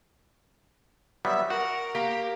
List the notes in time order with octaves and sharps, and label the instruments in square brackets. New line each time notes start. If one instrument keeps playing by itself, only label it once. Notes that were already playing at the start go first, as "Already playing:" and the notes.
[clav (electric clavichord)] F#3 G3 B3 [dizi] E5
[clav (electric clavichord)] F#4 [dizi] A#4 [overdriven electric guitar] F#5
[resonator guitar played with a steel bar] A#3 [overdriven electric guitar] G4